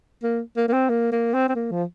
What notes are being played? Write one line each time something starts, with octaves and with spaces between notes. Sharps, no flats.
A#3
A#3
A#3
C4
A#3
A#3
C4
C4
A#3
F3